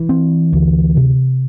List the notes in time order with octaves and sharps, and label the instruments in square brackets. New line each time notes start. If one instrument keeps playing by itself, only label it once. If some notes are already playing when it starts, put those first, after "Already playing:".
Already playing: [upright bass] E3
[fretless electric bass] C4
D2
C3